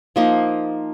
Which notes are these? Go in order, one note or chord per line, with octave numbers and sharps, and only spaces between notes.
F3 A#3 D#4